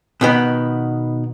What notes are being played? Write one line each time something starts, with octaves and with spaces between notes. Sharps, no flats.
B2 D#3 B3